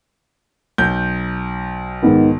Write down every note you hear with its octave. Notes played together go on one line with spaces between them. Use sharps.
B1 G6
G#2 D#3 B3